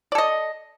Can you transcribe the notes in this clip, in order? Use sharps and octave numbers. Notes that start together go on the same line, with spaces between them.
A4 D5 D#5